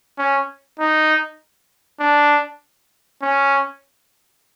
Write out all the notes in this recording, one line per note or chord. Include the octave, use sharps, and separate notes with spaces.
C#4
D#4
D4
C#4